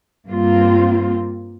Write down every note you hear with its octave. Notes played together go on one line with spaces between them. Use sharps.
G2 A#3 C4 F4